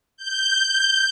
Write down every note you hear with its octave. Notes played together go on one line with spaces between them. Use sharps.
G6